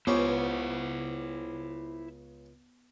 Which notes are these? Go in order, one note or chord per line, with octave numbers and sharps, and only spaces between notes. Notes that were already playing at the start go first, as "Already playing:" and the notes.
C#2 C#3 B3 E4 G4 C5